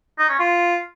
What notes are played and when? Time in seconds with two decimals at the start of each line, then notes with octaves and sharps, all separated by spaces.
0.19 D#4
0.29 C#4
0.39 F4